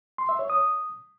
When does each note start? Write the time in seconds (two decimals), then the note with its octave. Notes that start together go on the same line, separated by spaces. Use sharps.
0.18 C6
0.29 E5
0.39 C#5
0.50 D#6